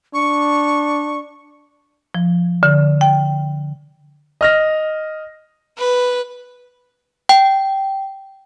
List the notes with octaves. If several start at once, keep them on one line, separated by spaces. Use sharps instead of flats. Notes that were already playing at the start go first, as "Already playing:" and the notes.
D4 C#6
F3
D3
G5
D#5 F6 A#6
B4
G5